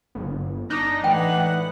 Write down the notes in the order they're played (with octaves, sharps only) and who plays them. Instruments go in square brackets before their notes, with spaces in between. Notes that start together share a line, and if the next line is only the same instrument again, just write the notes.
[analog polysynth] G1
[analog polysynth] D4 D#4 [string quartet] A#6
[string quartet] A2 F#5 [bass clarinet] E3 [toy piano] G5